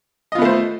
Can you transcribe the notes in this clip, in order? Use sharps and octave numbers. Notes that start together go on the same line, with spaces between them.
A3 B3 F4 C5 D#5